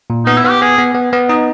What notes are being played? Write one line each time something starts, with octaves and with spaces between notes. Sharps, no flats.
A#2
B3 D#4
E4
B3 G4
B3 G#4
B3
B3
B3
D#4 D#5